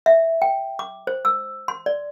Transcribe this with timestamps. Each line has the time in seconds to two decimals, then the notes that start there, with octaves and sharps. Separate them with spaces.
0.06 E5
0.42 G5
0.79 D6
1.07 C5
1.25 E6
1.68 C6
1.86 D5